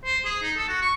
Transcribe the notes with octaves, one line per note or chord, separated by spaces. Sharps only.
C5
G#4
D#4
A4
F#4
C#6